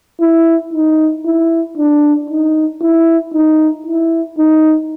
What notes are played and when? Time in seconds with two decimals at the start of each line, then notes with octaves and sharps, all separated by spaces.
0.21 E4
0.73 D#4
1.25 E4
1.77 D4
2.29 D#4
2.82 E4
3.34 D#4
3.86 E4
4.38 D#4